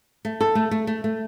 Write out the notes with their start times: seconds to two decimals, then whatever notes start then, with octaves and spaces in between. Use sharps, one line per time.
0.25 A3
0.41 A4
0.55 A3
0.71 A3
0.87 A3
1.04 A3